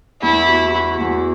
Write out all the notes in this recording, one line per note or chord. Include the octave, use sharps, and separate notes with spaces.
E2 E4
F#4
F#4
E2